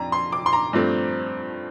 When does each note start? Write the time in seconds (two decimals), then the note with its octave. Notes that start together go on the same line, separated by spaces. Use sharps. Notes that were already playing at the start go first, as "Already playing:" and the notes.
Already playing: F2 D4 A#5
0.12 C6
0.32 D6
0.46 C6
0.53 A#5
0.73 G2 F3 A3 C4